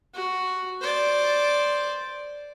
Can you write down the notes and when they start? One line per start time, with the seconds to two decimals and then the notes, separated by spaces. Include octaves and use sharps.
0.14 F#4
0.82 C5 D5